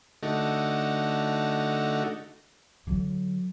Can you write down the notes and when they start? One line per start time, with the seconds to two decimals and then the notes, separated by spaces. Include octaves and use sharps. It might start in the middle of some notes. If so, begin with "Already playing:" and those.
0.23 D3 A3 D#4 F#4
2.87 D3 F#3